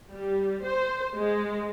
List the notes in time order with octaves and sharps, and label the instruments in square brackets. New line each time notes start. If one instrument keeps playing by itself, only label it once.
[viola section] G3
C5
G#3